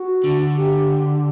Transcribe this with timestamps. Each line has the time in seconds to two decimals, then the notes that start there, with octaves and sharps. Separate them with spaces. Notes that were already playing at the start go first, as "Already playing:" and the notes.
Already playing: F#4
0.24 D3
0.56 G4